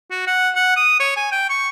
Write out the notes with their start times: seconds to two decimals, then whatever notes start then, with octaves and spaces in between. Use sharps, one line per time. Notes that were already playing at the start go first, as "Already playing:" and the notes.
0.11 F#4
0.27 F#5
0.55 F#5
0.76 D#6
1.00 C#5
1.17 G#5
1.32 G5
1.50 C#6